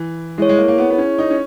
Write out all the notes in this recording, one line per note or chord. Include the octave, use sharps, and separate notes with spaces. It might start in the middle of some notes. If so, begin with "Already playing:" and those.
Already playing: E3
G#3 E4 G#4 C#5
G#3
A#3
A#3
B3
B3
C#4
D#4
C#4